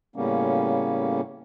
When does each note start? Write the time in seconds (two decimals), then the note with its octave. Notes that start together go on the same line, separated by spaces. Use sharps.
0.16 A2 C#3 G3 A#3 B3 C#4